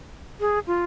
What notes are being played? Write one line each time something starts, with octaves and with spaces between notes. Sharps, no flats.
G#4
F4